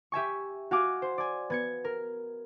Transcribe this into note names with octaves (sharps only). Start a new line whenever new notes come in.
G4 E5 G#5 C#6
F#4 F5 F#5 G#5 D6
C5
D5 G#5
B3 G#6 C#7
A#4